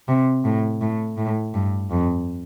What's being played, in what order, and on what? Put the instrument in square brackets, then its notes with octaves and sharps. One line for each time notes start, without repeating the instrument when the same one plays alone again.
[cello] C3
A2
A2
A2
G2
F2